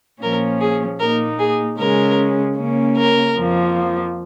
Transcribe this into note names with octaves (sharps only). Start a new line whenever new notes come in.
A#2 F3 C#4 A#4
G#4
A#2 A#3 D#4 A#4
G#4
C#3 G#3 C#4 A#4
C#3 A#3 C#4
A#4
F2 F3 A#3